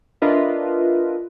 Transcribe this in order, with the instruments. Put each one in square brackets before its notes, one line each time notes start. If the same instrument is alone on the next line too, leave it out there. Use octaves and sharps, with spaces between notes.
[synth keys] D4 F4 A#4 B4 D#5 E5